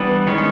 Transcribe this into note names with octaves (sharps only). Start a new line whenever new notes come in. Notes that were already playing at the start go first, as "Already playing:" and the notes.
Already playing: E3 G3 B3 D4
D#3 G#3 C#4